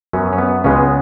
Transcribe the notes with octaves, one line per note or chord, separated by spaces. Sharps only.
F#2 F#3 B3 C#4
C#4
B3
C#2 C#3 G#3 B3 C#4